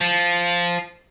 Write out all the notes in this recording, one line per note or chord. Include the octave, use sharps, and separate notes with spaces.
F3